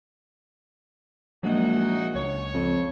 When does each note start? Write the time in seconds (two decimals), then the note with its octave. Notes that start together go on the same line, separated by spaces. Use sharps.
1.43 A#1 F#3 G#3 A#3 D#4 E4 F#4
2.15 C#2 C#5
2.54 F2